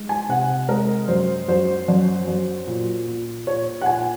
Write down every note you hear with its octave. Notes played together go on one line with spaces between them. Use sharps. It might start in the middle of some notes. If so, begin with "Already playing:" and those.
Already playing: G#3
G#5
C3 F#5
G#3 A#4
F#2 C5
F#2 C5
F#2
F#2
A#2
A#2
A#2 C#5
F#5
A#2 G#5